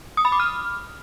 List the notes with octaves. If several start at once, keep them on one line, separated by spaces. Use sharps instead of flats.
D#6
B5
D6
F6